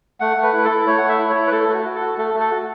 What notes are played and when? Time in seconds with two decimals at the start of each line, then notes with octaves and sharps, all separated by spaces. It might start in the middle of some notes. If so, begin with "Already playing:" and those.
0.20 A3 F#5
0.37 A3
0.43 B4
0.53 E4 B4
0.65 A4
0.70 E4
0.87 A3 C#5
0.98 A3 F#5
1.09 E5
1.19 E4
1.30 C#5
1.35 E4
1.47 B4
1.52 A3 A4
1.69 A3 F#4
1.84 F#4
1.95 A4
2.01 F#4
2.18 A3 A4
2.34 A3
2.40 A4
2.51 F#4